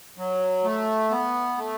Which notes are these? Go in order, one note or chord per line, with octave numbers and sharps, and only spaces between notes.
F#3
A3
B3
A3